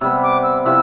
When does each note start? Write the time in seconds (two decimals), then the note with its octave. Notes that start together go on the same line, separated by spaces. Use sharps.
0.01 C3 G3 B3 E6
0.23 D6
0.43 E6
0.65 C3 F3 B3 E4 E6